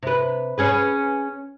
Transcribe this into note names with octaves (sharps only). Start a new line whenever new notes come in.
C3 B4
C#4 G#4 B4